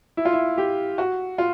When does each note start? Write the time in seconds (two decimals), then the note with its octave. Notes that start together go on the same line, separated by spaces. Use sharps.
0.17 E4
0.25 F4
0.33 E4
0.58 G4
0.98 F#4
1.38 F4